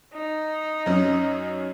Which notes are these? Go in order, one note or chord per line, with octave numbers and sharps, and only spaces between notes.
D#4
F#2 C#4